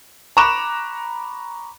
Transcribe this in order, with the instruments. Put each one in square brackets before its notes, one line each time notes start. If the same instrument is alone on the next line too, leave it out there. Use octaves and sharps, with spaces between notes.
[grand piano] A#5 B5 C#6 D6 F#6 E7